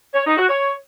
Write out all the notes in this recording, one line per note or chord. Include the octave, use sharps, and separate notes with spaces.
C#5
D#4
F#4
C#5